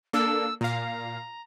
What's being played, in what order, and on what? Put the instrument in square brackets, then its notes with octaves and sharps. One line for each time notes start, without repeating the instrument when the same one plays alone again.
[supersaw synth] A#3 D4 A4 [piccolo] E6
[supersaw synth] A#2 F5 [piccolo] A#5